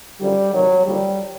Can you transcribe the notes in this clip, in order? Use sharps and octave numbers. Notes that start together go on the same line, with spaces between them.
F#2 D3 F3 G3
D2 C3 D#3 F#3
D#2 D3 F3 G3